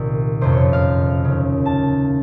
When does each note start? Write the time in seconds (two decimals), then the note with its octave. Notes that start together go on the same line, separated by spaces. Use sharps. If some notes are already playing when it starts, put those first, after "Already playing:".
Already playing: C2 A#2 D#3
0.41 F#1 F2 C3 C5
0.52 C#5
0.73 F5
1.24 D#2 C#3
1.66 A5